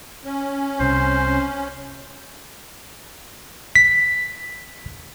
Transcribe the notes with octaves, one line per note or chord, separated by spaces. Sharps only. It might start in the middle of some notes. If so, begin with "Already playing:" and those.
C#4
C2 C3 C5
B6